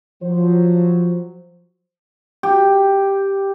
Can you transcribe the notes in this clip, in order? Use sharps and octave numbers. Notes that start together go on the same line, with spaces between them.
F3 F#3 C5
G4